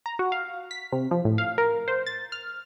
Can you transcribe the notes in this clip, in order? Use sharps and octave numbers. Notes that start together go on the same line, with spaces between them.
A#5
F#4
F5
B6
C3
F3
A2
F5
A#4
C5
A6
F6